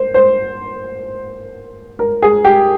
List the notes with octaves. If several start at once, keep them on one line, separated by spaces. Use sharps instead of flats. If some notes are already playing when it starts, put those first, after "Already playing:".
Already playing: A#3 C5
C5
A#4
G#4
G4